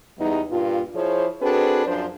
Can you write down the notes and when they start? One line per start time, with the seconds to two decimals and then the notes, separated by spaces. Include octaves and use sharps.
0.19 E2 G3 D#4
0.51 G2 A#2 F4
0.95 F3 E4 G#4 C5 C#5
1.42 C4 D4 F#4 G#4 A4 B4
1.86 F#2 F3 D4 C5